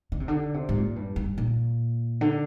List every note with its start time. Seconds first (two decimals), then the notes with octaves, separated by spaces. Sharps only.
0.12 D3
0.20 C3
0.28 D3
0.54 C3
0.69 G#2
0.75 A#2
0.96 G2
1.16 G2
1.38 A#2
2.21 D3